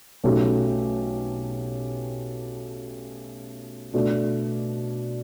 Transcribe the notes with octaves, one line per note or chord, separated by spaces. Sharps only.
B1 B2 A3 C#4 G4
B2 A3 D4